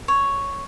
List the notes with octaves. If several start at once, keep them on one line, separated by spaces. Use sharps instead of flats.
C#5